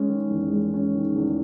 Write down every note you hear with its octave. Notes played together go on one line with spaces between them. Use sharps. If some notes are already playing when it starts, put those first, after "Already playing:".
Already playing: G#3 C#4
D#3
E2
G#3
C#4
D#3
E2